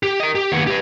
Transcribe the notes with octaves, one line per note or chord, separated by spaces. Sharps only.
G4
A#4 D#5
G4
D#2 B3
G4 B4